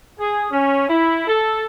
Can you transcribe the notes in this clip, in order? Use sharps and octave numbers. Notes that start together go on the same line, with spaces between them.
G#4
C#4
E4
A4